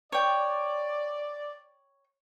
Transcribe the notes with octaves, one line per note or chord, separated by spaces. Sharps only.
C#5 D5 G5